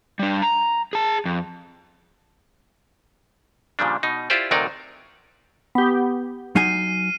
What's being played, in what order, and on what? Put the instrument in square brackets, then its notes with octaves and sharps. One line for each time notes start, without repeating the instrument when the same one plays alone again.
[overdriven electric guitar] G3 D4
A#5
G#4 A5
F2
[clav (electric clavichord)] A#2 C#3 F3 G3 D4
B2 D#4
E4 F4 G4 C5 D5
D2 C3 F#3 D#4 A#4 D5
[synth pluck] B3 G4
[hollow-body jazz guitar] F#3 D#4 G#5 [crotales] F6 C7 D#7